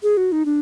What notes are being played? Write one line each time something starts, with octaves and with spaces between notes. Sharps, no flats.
G#4
F#4
D#4
D4